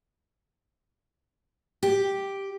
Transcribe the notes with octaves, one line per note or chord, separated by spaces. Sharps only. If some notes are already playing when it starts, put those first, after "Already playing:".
G4